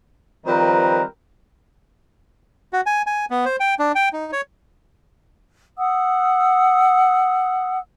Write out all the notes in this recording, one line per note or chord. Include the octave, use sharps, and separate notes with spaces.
D#3 F3 G3 C4 A#4 B4
F#4
G#5
G#5
B3
C5
G5
D4
G5
D#4
C#5
F#5 D#6 E6